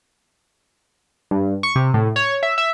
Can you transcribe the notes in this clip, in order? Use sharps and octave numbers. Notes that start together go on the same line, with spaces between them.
G2
C#6
C3
A2
C#5
E5
E5